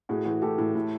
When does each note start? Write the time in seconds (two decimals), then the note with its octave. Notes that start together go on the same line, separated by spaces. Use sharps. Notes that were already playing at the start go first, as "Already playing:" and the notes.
0.09 A2 F#4 G#4
0.25 E3 F#4 G#4
0.42 A2 G4 A4
0.58 A2
0.75 A2